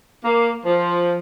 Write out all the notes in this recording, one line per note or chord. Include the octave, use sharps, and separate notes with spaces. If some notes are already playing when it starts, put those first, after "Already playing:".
A#3
F3